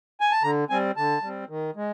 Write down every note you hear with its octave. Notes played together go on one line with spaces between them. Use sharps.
G#5
A5
D3 A#5
G3 C4 G#5
D3 A5
G3 C4
D#3
G#3